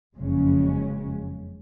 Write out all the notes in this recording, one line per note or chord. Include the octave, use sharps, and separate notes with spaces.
F#1 F2 C#3 G#3 C#4